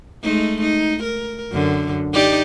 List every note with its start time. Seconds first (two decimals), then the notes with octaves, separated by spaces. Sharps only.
0.23 G#3 A3 D#4
0.62 D#4
1.04 A#4
1.52 F#2 D3
2.13 D#4 G4 D5